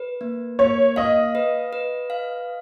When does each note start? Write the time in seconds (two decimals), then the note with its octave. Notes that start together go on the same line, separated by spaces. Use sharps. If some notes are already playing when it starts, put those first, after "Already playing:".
Already playing: B4
0.21 A#3
0.59 A#3 C#5
0.96 D#5 F5
1.35 B4
1.73 B4
2.10 F5